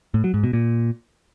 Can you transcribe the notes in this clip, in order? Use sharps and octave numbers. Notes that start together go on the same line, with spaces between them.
A2
F#3
G#2
B2
A#2